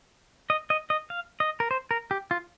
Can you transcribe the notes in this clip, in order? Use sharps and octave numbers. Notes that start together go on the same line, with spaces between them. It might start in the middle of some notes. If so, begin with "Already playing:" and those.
D#5
D#5
D#5
F5
D#5
A#4
C5
A#4
G4
F4